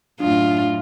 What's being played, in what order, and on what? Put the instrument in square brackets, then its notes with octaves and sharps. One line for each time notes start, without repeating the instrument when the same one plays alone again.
[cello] F#2 A2 [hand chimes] D4 [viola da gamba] F4